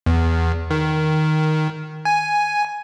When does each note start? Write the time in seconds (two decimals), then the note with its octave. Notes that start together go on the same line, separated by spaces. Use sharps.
0.06 E2
0.70 D#3
2.05 G#5